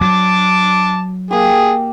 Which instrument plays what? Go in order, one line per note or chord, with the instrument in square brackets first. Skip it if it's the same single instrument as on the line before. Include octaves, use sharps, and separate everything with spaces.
[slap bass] F#3 [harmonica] A5 D6
[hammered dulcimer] A#3 G4 [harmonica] G#4